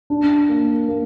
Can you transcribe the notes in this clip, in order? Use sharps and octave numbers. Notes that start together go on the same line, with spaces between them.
D4
A#3
A#3